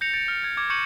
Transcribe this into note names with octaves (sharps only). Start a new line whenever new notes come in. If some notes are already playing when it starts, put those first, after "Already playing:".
G6 A#6 C#7 F7
A6 C#7 D7
F6
G#6
D6 G#6
C#6 G6 C#7 D#7 E7 F#7